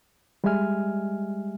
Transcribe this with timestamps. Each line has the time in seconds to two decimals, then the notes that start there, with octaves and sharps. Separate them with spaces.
0.44 G3 G#3 G4 E5 G#5 F6